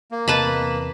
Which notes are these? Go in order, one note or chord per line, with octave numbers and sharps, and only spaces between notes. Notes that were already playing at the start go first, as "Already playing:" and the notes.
A#3
E2 C3 B4 D#5 A5 B5